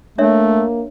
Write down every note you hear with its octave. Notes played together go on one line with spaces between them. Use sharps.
A3 A#3 D4 C#5 E5